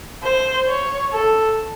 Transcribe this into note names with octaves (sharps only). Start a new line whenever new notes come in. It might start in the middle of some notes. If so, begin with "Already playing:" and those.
C5
C#5
A4